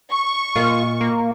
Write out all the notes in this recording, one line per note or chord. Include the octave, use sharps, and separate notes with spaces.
C#6
A#2 F4 A#4 D#5
A#3